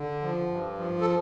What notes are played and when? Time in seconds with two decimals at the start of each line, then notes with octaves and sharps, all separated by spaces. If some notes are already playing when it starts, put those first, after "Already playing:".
Already playing: D3
0.22 F3
0.50 G2
0.78 F3
1.01 A4